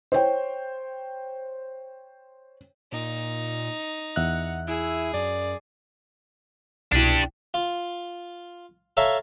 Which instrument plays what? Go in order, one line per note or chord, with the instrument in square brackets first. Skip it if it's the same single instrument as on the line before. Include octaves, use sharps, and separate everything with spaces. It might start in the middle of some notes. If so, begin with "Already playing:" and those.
[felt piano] C5 C#5 G5
[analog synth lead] A#2 [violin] D#4
[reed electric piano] E2 E5 F#6 [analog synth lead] F#5
[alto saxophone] E4 [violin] G#4 [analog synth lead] E6
[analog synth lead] F#2 [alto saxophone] D5
[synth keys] C2 B2 E4 [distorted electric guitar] D4 G4
[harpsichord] F4
A4 C#5 E5 F5 A5 A#5